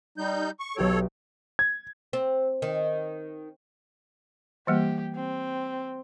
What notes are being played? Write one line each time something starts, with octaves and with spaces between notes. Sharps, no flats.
G3 D#4 G6
C#6
B1 G4 A4 C#5 D7
G#6
C4
D#3
E3 G3 A#3 G4
C4